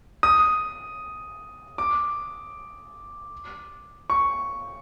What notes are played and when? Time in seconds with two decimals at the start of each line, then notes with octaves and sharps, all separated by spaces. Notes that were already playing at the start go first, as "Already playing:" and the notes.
0.23 D#6
1.78 D6
4.10 C#6